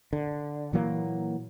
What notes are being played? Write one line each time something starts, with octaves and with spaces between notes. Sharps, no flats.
D3
A#2 E3 F#3 A#3